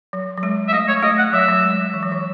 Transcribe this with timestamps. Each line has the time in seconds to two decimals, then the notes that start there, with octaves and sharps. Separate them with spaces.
0.13 F#3
0.37 F#3
0.43 G#3
0.68 E5
0.73 A3 D#5
0.88 C#5
1.03 A3 D#5
1.18 F#5
1.33 F#3 E5
1.49 F#3
1.63 G#3
1.94 E3
2.03 F#3
2.12 E3